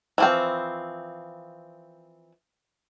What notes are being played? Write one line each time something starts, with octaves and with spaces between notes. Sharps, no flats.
E3 F3 C4